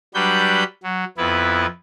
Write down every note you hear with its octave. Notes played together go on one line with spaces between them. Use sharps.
F#3 G3 D4 B4 B5 G6
F#3
F2 B3 E4 B4